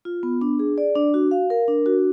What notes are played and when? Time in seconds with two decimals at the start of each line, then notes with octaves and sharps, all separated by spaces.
0.05 F4
0.23 B3
0.41 D4
0.59 G#4
0.78 D5
0.96 D4
1.14 F#4
1.31 F5
1.50 A#4
1.68 D4
1.86 F#4